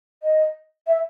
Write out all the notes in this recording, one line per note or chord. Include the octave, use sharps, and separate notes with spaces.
D#5
E5